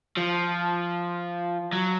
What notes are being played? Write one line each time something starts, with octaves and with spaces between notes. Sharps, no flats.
F3
F#3